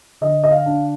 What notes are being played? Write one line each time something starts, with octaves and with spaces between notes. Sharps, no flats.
D3 D#5
D#5
F5
D4